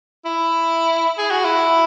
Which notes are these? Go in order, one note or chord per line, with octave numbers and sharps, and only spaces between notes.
E4
G#4
F#4
E4